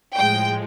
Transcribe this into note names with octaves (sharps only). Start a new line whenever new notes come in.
A2 F3 G#3 G5